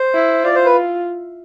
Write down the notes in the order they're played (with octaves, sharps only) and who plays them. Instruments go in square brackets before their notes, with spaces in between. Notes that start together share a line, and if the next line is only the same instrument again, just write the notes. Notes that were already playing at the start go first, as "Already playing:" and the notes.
Already playing: [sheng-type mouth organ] C5
[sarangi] E4
[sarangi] F4 [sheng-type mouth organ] D5
[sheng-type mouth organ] C5
B4